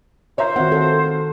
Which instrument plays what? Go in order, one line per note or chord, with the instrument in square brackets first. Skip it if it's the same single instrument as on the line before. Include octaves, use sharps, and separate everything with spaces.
[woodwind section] F4 A#4 C5 [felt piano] C#5 E5 A#5
[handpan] D#3 F#5 [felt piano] C4 F#4
[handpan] A4